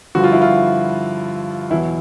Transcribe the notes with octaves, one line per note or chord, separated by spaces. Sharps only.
G2 D3 F3 F#4
F4
E4
F4
E2 B2 F#3 E4